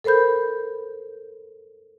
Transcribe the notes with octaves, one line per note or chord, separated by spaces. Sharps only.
A4 A#4 C5 B5 G6